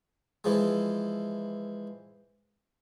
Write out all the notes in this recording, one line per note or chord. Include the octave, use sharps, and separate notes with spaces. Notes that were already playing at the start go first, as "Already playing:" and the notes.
E3 F3 G#3